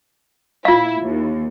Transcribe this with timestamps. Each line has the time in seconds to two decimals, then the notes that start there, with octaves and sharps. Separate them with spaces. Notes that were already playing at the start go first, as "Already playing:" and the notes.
0.65 A#2 E4 F4 F5
1.02 D#2